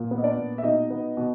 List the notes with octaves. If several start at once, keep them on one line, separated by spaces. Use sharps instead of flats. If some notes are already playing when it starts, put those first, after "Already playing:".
Already playing: A#2
B3
D#5
D4 D5
A#2
E5
B2 D#4 D#5
B3
B2